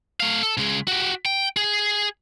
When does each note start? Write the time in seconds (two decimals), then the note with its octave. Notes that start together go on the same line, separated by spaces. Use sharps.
0.20 A3 F5
0.43 A4
0.57 C#3 G#3
0.88 F#4 G4
1.26 G5
1.57 G#4